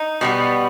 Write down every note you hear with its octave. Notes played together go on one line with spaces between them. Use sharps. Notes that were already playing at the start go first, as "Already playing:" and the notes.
Already playing: D#4
B2 G3 B3